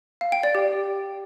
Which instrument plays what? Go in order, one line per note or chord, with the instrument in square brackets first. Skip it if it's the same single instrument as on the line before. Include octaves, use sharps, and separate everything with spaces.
[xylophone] F5
G5
D5
G4